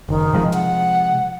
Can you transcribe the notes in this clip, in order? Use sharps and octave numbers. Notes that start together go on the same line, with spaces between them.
F#1 D#3
C3 F3 G#3
F#5